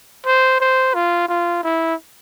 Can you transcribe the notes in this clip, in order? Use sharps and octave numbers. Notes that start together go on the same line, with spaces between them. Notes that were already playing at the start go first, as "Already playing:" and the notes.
C5
C5
F4
F4
E4